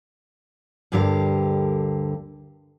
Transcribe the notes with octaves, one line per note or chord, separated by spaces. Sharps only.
D2 G2 D3 G4 A#4 F5